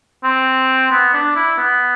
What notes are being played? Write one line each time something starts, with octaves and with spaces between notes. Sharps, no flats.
C4
B3
D4
E4
B3